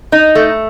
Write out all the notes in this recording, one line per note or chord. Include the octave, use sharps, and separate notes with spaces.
D#4
A3